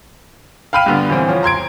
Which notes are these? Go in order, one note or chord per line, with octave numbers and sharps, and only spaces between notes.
F5 G5 B5 F6 D#7
G2 D3 B3
D#1 E3 C4
F3 C#4
A#5 C6 G#6 D7